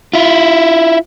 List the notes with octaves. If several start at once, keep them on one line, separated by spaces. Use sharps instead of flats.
E4 F4